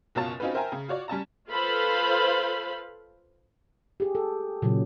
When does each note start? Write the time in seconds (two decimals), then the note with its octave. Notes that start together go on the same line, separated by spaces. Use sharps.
0.15 F#1 B2 F4 C#5 A5 A6
0.40 C4 C#4 D#4 F4 F#4 B4
0.54 A#4 C5 E5 G5 G#5 A#5
0.72 C#3
0.88 F4 F#4 C#5 D5
1.08 G3 C#4 A5 A#5
1.50 F4 A4 B4 C5 F5 B5
4.00 G4 G#4
4.15 A4
4.62 A#2 C#3 F#3